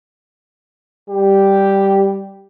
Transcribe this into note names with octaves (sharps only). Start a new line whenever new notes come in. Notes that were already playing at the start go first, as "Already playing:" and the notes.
G3 G4